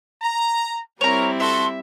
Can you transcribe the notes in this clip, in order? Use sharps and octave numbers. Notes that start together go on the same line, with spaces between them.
A#5
G3 C4 E4 A#4 C#5 A#5
F#4 A4 E5 C6